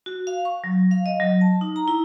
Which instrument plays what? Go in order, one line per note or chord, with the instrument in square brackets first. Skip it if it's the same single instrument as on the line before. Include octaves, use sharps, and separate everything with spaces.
[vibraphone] F#4
F5
C#6
F#3
F5
D#5
F#3
A5
D#4
A#5
E4